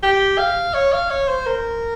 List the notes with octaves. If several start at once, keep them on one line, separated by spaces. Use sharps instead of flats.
G4
F5
C#5
F5
C#5
C5
A#4